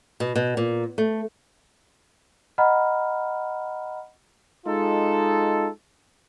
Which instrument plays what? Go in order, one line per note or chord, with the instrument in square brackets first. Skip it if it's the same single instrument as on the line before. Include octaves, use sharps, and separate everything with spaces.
[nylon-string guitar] B2
B2
A#2
A3
[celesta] D#5 F#5 A#5 B5 F6
[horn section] G#3 D#4 F4 A4